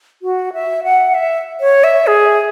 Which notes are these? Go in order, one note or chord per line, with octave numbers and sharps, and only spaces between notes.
F#4
E5
F#5
E5
C#5
E5
G#4